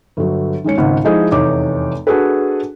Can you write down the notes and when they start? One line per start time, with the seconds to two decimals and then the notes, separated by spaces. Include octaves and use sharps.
0.17 G1 F#3
0.64 D#3 G#3 C#4 C#7
0.78 G#1 C#2 F#5
1.05 F3 G#3 D#4 E4 G#4 D#5
1.31 F1 E2 D#4 C#5 D6
2.07 D4 F#4 G#4 A4 B4